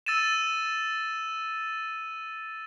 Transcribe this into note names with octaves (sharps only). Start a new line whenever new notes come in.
E6 A6 D#7 E7